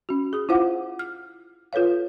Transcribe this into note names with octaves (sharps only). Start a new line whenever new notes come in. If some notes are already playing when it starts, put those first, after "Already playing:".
C#4 F#4
G#4 D#6
E4 F4 C5 F5 F#5 D6
F6
F4 A4 B4 C#5 F5